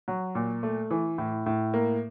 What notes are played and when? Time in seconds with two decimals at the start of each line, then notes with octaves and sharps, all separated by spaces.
0.08 F#3
0.35 A#2
0.63 A3
0.91 E3
1.18 A2
1.46 A2
1.74 A#3